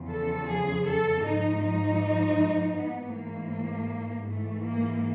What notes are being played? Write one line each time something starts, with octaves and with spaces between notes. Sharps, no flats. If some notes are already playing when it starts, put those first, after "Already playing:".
Already playing: E2 C#3 F3
A4
G#4
A4
G#2 F3 D#4
D#4
G#2 E3 B3
A#3
G#2 E3 A3
A#3